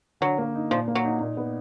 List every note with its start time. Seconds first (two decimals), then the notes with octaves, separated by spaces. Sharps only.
0.21 D3 F#3
0.38 A#3
0.55 D#4
0.71 A#2 F3
0.88 A#3
0.95 F#3
1.05 D#4
1.21 A#2
1.37 B3